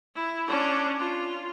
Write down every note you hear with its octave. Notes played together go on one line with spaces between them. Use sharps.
E4
C#4 D4
F4